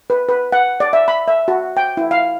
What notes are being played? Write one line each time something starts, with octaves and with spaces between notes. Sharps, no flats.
B4
B4
F#5
D5
E5
B5
E5
F#4
G5
E4
F5